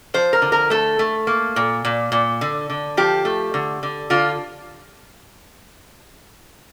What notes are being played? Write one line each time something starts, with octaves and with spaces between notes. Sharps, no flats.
F3 C5
A#4
D3
A#4
A3 A4
A3
A#3
A#2
A#2
A#2
D3
D3
F3 G4
A3
D3
D3
D3 F4